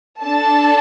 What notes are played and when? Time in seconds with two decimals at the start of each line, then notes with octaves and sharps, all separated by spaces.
0.22 D4 A4 A5